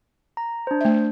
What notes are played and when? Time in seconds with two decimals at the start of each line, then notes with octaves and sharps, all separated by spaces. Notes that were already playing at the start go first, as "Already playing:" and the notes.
0.37 A#5
0.67 D4 C5
0.81 A3 E5